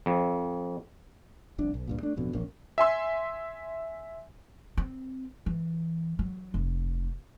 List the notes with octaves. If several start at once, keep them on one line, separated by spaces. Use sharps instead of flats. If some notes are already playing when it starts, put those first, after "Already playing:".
F2
F1 C2 D4
B1
C#2 G2 A#2
A3 D4
D1 F2 B2 D3
E1 A#1 A#3 C#4
E5 G#5 C6 E6
C4
E3
F#3
F1